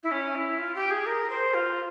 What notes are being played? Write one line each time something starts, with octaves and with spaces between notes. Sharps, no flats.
E4
C#4
E4
F4
G4
G#4
A#4
C5
F4